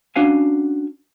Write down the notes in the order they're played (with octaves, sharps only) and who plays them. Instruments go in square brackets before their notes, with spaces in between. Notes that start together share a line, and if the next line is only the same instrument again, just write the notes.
[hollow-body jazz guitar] C#4 D4 F#4 F5 G#5